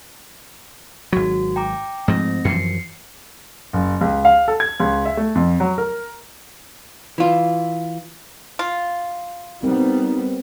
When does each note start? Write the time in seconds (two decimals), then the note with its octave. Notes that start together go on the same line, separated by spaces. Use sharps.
1.13 G#1 F#3 F#4
1.56 G5 A#5 D6
2.08 G#2 F3 A3 C4 A#6
2.45 F#2 E3 F3 C7 C#7
3.73 F#1
4.01 C#2
4.25 F5
4.48 A4
4.60 G#6
4.80 C#2
5.06 E5
5.17 A3
5.35 F2
5.60 F#3
5.78 A#4
7.18 E3 F4
8.59 F4
9.63 G3 B3 C4 D#4 A#4